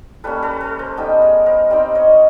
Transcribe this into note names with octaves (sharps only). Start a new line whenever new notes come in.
G3 A#3 C#4 A4 B4
A4 B4
A4 B4
A#4 C5
G3 B3 D#4 G4 A4
G#4 A#4
A#4 C5
G3 C4 D#4 C5 D5
C#5 D#5